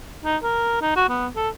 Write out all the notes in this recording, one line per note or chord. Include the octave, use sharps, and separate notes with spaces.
D#4
A#4
D#4
F#4
B3
A4